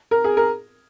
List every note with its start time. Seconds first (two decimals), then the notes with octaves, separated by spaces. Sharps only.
0.11 A#4
0.24 G#4
0.37 A#4